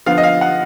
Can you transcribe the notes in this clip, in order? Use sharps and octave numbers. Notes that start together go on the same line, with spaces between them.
D3 F3 B3 F5
D#5
F5
F#5